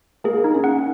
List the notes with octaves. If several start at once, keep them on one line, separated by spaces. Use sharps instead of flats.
A#3 G#4
D#4
C#4
F#5